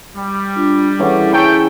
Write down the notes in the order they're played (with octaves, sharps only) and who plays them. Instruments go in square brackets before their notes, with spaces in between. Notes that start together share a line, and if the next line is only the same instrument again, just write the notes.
[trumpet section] G3
[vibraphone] D4 F4
[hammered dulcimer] E3 C#4 D6 [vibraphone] G#4 A4 F#5
[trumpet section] A3 G5 [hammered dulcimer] C#4 C#6 [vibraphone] G#4 G#5 A#5